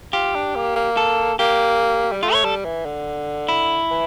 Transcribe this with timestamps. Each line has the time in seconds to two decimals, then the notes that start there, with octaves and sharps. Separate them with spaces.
0.13 F4 G4
0.35 D4
0.55 A#3
0.76 A#3
0.97 A4
1.39 A#3 G4
2.12 G3
2.23 A3 F4
2.33 C#5
2.44 G3 A4
2.65 E3
2.85 D3
3.48 E4
3.91 E3